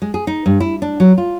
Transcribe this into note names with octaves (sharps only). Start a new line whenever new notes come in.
G#3
G#4
D#4
G2
E4
D4
F#3
F4